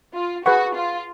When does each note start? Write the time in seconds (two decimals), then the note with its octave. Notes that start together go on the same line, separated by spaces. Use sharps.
0.15 F4
0.45 F#4 G#4 B4 F#5 C#6
0.76 F4